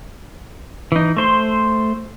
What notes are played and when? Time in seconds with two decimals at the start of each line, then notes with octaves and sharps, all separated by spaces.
0.92 E3 D#4
1.17 A3 C5 C6